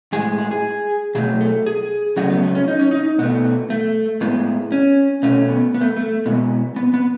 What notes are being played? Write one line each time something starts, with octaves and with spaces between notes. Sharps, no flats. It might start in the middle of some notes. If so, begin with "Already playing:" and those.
A2 G#3 G#4
G#4
G#4
B2 F#3 A3 G#4
A4
G#4
C#3 F#3 A3 F#4
B3
A3
C#4
D#4
C#4
D#4
B2 A3 B3
A3
A2 G#3 B3
C#4
B2 A3 C#4
B3
B3
A3
A3
B2 G#3 B3
B3
B3